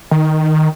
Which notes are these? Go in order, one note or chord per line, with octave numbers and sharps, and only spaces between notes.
D#3